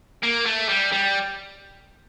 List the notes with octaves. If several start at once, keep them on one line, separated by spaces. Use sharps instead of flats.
A#3
A3
G3
G3